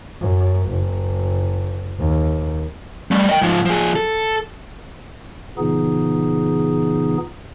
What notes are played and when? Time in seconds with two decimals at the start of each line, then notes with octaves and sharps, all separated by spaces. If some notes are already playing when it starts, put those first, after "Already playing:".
0.21 F#2
0.70 F#1
2.00 D#2
3.11 G3 A3
3.29 D#5 G5
3.41 G#2 F3
3.65 F3 G#4
3.96 A4
5.58 A#2 C#3 E3 B3 D#4 G#4